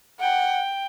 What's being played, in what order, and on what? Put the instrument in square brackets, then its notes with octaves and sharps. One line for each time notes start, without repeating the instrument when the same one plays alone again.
[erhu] F#5 [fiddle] G5